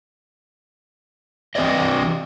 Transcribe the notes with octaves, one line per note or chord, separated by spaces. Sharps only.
E3 C4 G4 B4 D5 D#5